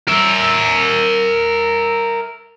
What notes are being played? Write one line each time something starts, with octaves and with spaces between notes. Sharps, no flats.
A#4 E5